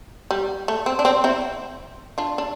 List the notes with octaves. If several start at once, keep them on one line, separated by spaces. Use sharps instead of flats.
G3
A3
C4
D4
C4
C4 E4
D4 F4
D4